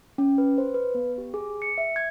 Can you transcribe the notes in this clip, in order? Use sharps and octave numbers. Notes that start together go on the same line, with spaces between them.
C#4
B4
C5
B4
B3
G4
G#4
C#7
E5
G#6